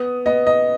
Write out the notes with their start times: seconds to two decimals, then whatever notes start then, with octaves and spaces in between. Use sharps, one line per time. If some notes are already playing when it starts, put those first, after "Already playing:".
Already playing: B3 D#6
0.26 B3 D#5
0.47 D#5